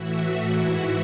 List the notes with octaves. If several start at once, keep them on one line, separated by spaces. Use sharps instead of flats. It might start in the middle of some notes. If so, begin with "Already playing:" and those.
Already playing: A2 E3 E4 F#4
E4 F#4
G#2 E3